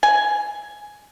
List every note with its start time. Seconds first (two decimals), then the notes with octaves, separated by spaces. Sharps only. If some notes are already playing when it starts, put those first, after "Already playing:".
0.03 G#5